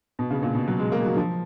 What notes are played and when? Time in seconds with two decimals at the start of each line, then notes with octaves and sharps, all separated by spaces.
0.19 B2
0.31 C#3
0.42 A#2
0.55 B2
0.68 F#3
0.79 G#3
0.92 A#3
1.05 F#3
1.17 F3